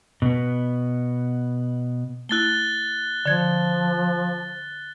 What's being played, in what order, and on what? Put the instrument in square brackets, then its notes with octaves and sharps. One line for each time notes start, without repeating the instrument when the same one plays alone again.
[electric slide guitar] B2 B3
[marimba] A3 E4 [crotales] F#6 A6 G7
[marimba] D3 G#6 [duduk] F3